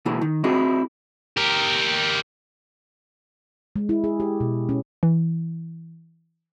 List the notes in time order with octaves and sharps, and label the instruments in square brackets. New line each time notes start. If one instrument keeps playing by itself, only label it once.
[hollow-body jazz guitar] B2 E3 A#3 E4 G#4
D#3
C4 E4 F#4 G#4 D#5
[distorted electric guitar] G4 A#4
[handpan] G#3
E4
G#4
G4
B2
C#4
[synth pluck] E3